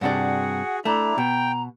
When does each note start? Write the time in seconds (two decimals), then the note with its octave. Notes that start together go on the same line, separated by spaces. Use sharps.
0.01 G2 C3 D4 F#4 G#4 F#5
0.85 A3 D4 E4 A#5
1.18 B2 G5